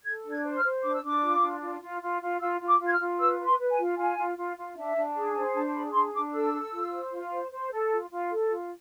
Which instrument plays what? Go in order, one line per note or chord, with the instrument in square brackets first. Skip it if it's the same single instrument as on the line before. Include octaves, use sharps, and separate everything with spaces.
[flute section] A4 G#6
D4
G#6
C5
F6
C5
D4 D6
E6
D4 D6
F4
D4
F4
F4
F4
F4
F4 E6
F4
D6
F4
G#6
F6
F4
B4 E6
B4
C6
B4
G#5
F4
F4 G#5
F4
F4
F4
D4 E5
D4
G#4
C5
D4 A5
G#4 B5
D4 C6
D4 D6
A4 E6
A4
F4
C5
F4
C5
C5
A4
F4
F4
A4
F4